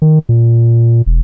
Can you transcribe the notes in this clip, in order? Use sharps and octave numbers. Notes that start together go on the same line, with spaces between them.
D#3
A#2
E1